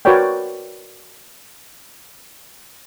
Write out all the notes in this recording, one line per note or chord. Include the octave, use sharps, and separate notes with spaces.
F#4 A#4 B4 C#5 D5 G5